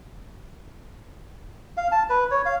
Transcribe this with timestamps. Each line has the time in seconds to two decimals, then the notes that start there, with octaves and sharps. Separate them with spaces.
1.77 F5
1.92 A5
2.10 B4
2.31 C#5
2.45 F5